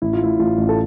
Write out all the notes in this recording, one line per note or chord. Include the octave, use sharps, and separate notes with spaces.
A1 E4
F4
A2 E4
A1 F4
A1
A4